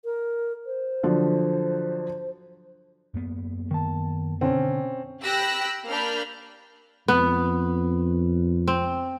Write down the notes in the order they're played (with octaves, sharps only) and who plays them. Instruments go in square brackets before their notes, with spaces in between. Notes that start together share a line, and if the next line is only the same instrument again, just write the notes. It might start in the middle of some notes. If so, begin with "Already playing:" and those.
[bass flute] A#4
C5
[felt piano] D3 F3 F#3
[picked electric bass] F#2 A#3 B3
[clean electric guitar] D#3 A5
[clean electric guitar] B2 D3 [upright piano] C4 C#4
[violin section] G4 G5 B5 E6 F#6 A#6
A#3 D4 B5 F6 G6
[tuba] F2 [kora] B3
[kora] C4